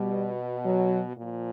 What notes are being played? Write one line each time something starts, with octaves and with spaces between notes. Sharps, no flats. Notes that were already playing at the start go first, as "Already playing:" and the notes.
Already playing: B2 G3
F#3
A#2 F3